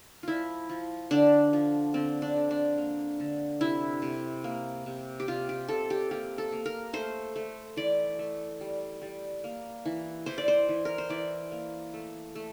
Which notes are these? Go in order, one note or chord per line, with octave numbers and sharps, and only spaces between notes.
F3 E4 F4
F3
D3 D4
F3
D3 C4
D4
D3
D4
A#3
D3
C3 E4
C3
A#3
C3
G4
C3 F4
G4
C3 A4
G4
A#3 G4
A4
A#3
A#4
A3 C5
A3
E3 D5
A3
G3
G3
A#3
E3
E3 C5
D5
C5
E3
A#4
C5
E3 D5
A#3
A3
A3